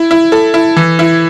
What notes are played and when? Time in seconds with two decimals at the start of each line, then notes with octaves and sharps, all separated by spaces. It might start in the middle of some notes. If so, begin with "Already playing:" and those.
Already playing: E4
0.11 E4
0.32 A4
0.54 E4
0.77 E3
0.99 E4